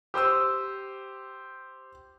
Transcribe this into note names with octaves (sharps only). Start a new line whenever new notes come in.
G4 C5 D#6 E6